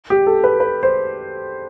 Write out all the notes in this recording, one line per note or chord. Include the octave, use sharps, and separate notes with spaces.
G4
A4
B4
B4
C5